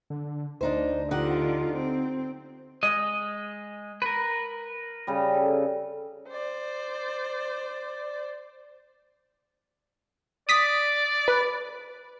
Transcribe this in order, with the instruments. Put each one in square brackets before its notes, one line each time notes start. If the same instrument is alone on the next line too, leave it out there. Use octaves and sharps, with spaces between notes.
[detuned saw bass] D3
[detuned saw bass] D2 [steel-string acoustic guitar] D4 D#4 C5
[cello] D3 F4 [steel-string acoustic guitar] D#4 G4 F#5
[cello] C4
[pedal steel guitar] G#3 D#5
A#4 B4
[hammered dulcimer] C#3 G3
A4
[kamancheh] C5 D5
[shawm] D5 [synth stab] D#6 B6
[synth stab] B4